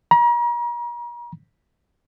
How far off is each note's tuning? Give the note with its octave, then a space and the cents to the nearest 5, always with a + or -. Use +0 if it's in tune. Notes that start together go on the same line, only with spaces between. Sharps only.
A#5 +40